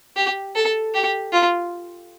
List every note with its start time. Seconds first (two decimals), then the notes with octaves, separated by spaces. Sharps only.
0.16 G4
0.56 A4
0.94 G4
1.33 F4